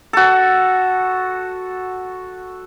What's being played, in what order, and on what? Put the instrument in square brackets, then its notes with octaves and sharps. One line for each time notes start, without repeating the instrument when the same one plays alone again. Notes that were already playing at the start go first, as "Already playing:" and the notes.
[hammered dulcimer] F#4 A4